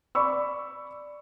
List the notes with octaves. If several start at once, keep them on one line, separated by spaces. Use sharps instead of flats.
D5 B5 C#6 E6